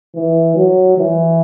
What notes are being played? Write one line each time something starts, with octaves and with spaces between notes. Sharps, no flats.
E3
F#3
E3